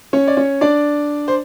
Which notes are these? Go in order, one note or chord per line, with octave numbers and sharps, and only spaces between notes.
C#4 C#5
D5
C#4 C#5
D4 D5
C5